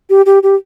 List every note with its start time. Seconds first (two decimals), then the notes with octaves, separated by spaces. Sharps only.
0.10 G4
0.26 G4
0.43 G4